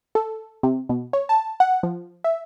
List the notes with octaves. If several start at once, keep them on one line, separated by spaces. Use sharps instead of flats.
A4
C3
B2
C#5
A5
F#5
F3
E5